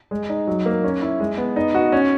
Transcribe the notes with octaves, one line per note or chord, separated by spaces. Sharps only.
G#3
D#4
F#3
A#3
C#4
E4
G#3
B3
D#4
F#4
C#4